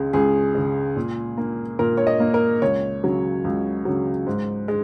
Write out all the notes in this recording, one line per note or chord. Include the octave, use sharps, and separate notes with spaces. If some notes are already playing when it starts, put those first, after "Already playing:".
Already playing: C#2 C#3 G#3
C#2 G#4
C#3 G#3
A#2
A#3
A#2 A#4
C#5
D#5
A#3
A#4
C#2 C#5
C#3 F#3
C#2
C#3 F#3
G#2
G#3